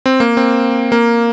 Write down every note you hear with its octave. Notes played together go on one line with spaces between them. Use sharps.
C4
A#3
C4
A#3